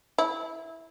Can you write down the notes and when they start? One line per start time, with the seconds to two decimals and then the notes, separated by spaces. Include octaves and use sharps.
0.18 E4